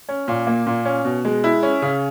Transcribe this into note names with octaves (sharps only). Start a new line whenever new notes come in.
C#4
A#2
A#3
A#2
C#4
B2
G#3
E4
C#4
C#3